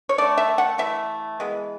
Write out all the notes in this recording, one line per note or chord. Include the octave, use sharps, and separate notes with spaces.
C#5
D3 A3 D5
E5
F#5
E3 A3 E5
E3 G#3 B3